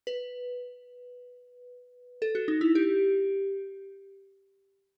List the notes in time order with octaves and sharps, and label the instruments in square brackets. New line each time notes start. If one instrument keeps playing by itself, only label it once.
[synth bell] B4
A4
F#4
D#4
E4
G4